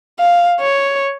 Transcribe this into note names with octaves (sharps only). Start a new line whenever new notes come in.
F5
C#5